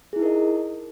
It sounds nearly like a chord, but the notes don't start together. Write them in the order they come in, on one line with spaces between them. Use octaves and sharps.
G#4 E4 D#4 A#4 D#5